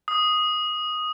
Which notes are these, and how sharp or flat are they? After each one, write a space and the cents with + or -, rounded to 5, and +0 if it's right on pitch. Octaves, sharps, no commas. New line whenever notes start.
D#6 +0